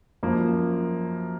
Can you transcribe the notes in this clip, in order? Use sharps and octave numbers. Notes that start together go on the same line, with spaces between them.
F#2 F3 A#3